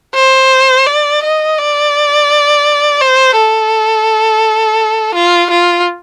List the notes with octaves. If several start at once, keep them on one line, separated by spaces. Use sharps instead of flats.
C5
D5
D#5
D5
C5
A4
F4
F4